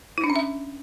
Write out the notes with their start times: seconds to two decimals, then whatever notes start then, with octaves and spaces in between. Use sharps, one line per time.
0.18 E4
0.24 D4
0.30 C#4
0.36 E5